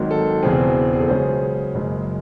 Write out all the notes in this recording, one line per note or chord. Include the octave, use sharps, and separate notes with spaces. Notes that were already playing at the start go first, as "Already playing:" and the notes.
Already playing: G#1 G#2 D#3 F#3
A4
E1 E2 C#3 E3 C4 G#4
G#4
A4
C#2 C#3 F#3 C#4 G#4 C5
F#1 F#2 C#3 G#3